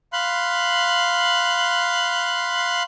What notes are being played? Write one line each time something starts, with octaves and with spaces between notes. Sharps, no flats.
F5 B5 C6 F#6